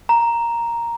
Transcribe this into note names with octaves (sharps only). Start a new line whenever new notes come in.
A#5